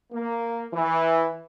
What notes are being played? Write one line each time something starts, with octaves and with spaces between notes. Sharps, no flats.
A#3
E3